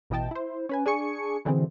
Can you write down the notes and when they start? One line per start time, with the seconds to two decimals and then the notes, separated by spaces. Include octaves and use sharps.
0.10 A1 B2 E3 D#5 G5 A5
0.31 E4 C5
0.69 C#4 B4 G#5
0.86 D4 G#4 G#5 C#6 C#7
1.45 B2 D3 E3 G#3 C4